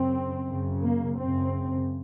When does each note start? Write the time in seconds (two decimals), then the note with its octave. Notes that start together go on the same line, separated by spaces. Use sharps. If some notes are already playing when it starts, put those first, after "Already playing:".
Already playing: F#2 C#3 C4
0.46 F#2 C#3
0.82 A#3
1.18 F#2 C#3 C4